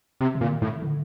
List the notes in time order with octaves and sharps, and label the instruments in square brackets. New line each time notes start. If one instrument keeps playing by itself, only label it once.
[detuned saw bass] C3
[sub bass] C3
[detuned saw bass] A#2 [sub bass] D3
[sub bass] D#3
[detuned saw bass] A2
[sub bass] D3